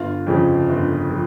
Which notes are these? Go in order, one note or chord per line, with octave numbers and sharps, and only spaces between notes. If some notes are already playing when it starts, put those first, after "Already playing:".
Already playing: G1 F4
F2 C#3 F3
G1
F3